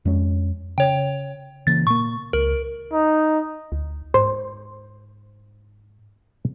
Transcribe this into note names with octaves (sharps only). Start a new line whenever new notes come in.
F2 G#3 C#4
C#3 C#5 G5
C#3 E3 A#3 A6
A#2 A#3 C#6
C#2 A#4
D#4
D2
G#2 C5